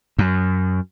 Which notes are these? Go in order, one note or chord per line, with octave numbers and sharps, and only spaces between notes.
F#2